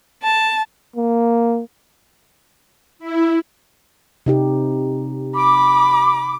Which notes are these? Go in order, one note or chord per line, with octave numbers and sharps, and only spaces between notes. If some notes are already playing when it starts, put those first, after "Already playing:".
A5
A#3
E4
C3 D#4 G4
B5 D6